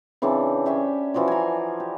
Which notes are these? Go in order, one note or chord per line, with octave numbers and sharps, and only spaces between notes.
C#3 E3 C4 D4
C#4 D4 G4 E5
E3 F3 F#4 D5
G#5 A#5
G4